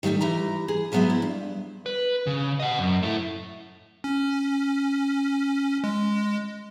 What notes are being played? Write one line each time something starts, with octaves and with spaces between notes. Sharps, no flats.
D#3 F#3 G3 A3 D#4
E3 G4 A#5
G#4
F3 F#3 G#3 B3 C5 E5
E4
G2
B4
C#3
D#5 F#5
F#2
A3 E4
C#4
G#3